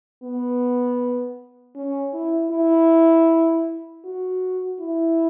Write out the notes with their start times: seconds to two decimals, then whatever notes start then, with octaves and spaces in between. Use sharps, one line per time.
0.23 B3
1.76 C#4
2.14 E4
2.52 E4
4.04 F#4
4.81 E4